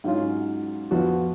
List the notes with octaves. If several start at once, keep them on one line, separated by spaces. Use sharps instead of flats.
G#2 F#3 C#4 F4
F2 F3 B3 F#4